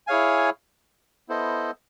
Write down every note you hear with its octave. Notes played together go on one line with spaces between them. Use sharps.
E4 G#4 C#5 F5 G#5
B3 E4 A4 C5 D#5